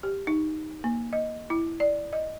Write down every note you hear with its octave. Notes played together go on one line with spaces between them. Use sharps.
G4
D#4
A#3
D#5
E4
D5
D#5